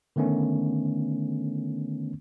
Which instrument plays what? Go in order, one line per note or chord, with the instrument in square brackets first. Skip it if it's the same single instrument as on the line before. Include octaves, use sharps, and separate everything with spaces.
[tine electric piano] D3 D#3 A3 B3 C#4